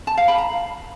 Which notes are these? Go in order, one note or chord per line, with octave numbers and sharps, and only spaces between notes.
A5
F5
B5
A#5